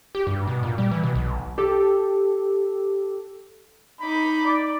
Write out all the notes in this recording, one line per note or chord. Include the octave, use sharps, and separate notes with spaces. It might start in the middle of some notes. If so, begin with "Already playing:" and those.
G4
G2
B2
A#2
G3
E3
B2
B1
G4 A4
D#4 B5 D6
D5